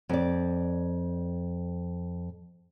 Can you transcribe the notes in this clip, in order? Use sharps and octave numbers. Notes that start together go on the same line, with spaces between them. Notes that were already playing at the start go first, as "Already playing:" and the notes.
F2 D5